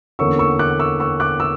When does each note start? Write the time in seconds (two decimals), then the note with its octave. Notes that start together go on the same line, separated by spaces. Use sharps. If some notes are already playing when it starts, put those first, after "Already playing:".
0.19 E2 D3 A#3 C#4 C#6 E6
0.39 C#6 E6
0.59 D6 F#6
0.80 C#6 E6
1.00 C#6 E6
1.20 D6 F#6
1.40 C#6 E6